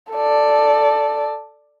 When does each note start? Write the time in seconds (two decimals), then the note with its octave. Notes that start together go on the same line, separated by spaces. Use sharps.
0.12 A4 D5